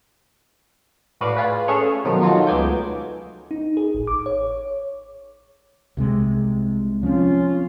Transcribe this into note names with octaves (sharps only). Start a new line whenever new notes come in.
A2 F#4 B4 D5 F5
F4 G#4 B4
A3 C#4 G#4 A4 C#5
B2 D#3 F3 F#3
F#3 D#4 F4 F#4 A4
C#2 A3 B3 G#5 D6 G6
D#4
G#4
A1
D6
C#5
C2 C3 G#3
F3 C4 C#4 F4